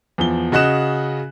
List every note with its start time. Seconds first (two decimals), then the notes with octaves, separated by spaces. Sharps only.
0.18 E2 F3 G7
0.52 C#3 F#4 D#5 F#6 E7